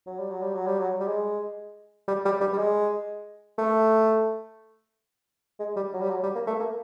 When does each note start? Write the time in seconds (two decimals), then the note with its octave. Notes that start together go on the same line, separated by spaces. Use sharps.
0.06 F#3
0.19 G3
0.30 F#3
0.42 G3
0.54 F#3
0.67 G3
0.79 F#3
0.99 G3
1.07 G#3
2.08 G3
2.25 G3
2.41 G3
2.53 G3
2.58 G#3
3.58 A3
5.59 G#3
5.76 G3
5.94 F#3
6.02 G3
6.10 F#3
6.23 G3
6.35 A#3
6.47 A3
6.60 A#3